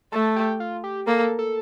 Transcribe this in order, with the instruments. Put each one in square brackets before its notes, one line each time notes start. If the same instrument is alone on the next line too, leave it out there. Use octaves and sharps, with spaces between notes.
[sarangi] A3 [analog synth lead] A4
[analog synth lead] G4
F4
G4
[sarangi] A#3 [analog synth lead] A4
[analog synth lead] A4